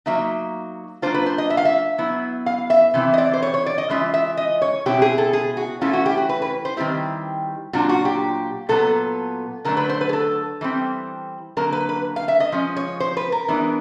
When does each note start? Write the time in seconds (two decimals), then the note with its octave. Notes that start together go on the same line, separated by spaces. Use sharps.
0.06 F#3 A#3 D#4 E5
1.02 F#3 A#3 D4 F4 C5
1.14 B4
1.26 C5
1.38 D#5
1.50 E5
1.57 F5
1.65 E5
1.98 F#3 B3 E4
2.46 F5
2.70 E5
2.94 C3 E3 C4 E4
3.14 D#5
3.18 D5
3.33 C5
3.42 C#5
3.54 C#5
3.66 D5
3.78 D#5
3.90 E3 G#3 C#4 F4 E5
4.14 E5
4.37 D#5
4.62 C#5
4.86 B2 G#3 C4 E4 G4
5.02 G#4
5.18 A4
5.33 G#4
5.57 F#4
5.81 E3 A3 C#4 E4 F4
5.93 F#4
6.06 G4
6.17 F#4
6.29 B4
6.42 B4
6.65 C5
6.77 D#3 G3 C4 E4 G4
7.73 A#2 F#3 A#3 D4 F4 F#4
7.89 F#4
8.05 G4
8.69 A#2 F#3 B3 A4
9.65 D3 F#3 A3 D4 A#4
9.77 B4
9.89 C5
10.01 B4
10.09 G#4
10.13 A4
10.61 E3 G3 C4
11.57 D3 F#3 A#3 A#4
11.73 B4
11.89 B4
12.16 F5
12.28 E5
12.40 D#5
12.52 F3 G#3 C#4
12.76 C#5
13.00 C5
13.17 B4
13.32 A#4
13.48 E3 G#3 B3 D4